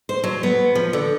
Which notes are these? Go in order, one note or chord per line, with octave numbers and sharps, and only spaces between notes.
C5
F#3
B3
F3
D3